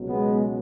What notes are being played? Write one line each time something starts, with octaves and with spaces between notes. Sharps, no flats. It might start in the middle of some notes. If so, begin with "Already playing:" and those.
Already playing: C#2 B2 F#3
G#3 B3